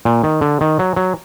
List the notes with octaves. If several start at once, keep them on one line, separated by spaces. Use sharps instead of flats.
A#2
D#3
D3
D#3
F#3
F#3